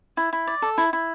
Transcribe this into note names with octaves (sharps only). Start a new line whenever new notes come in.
E4
E4
D5
A4
E4
E4